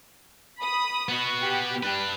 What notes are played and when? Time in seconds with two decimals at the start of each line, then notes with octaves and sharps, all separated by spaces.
0.59 B5 D#6
1.09 B3 F#4
1.41 G4
1.83 D4 B4